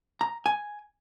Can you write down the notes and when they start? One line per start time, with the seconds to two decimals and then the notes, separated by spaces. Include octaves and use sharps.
0.21 A#5
0.46 G#5